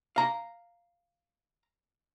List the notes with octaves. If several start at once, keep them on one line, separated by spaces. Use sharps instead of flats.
F5 A#5